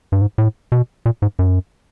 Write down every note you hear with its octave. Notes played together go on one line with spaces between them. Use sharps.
G2
G#2
A2
B2
A#2
G#2
F#2